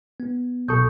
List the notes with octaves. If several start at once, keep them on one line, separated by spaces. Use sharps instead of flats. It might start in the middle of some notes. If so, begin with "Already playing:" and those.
B3
B1 A4 C#6 D#6 G6